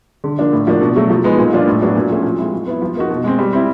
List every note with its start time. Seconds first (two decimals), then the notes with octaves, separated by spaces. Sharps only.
0.24 D3
0.39 F3 A#3 D4
0.53 A2
0.67 F3 A#3 D4 F#4
0.81 B2
0.95 F#3 A3
1.10 F3
1.24 G#3 B3 D#4
1.38 A#2
1.53 F3 A#3 D4 F4
1.67 A2
1.81 F#3 B3 D4 F#4
1.95 A#2
2.10 F3 A3 C#4 F#4
2.24 F3
2.38 G#3 C4 E4
2.52 F#3
2.67 B3 E4
2.82 F3
2.95 A#3 D#4 F#4
3.10 B2
3.24 G#3 C4
3.39 G3
3.53 C4 E4